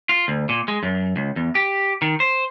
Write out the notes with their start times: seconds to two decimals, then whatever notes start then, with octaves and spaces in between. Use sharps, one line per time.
0.09 F4
0.28 D2
0.49 A#2
0.68 G#3
0.83 F#2
1.16 C#2
1.36 E2
1.55 G4
2.02 D#3
2.20 C5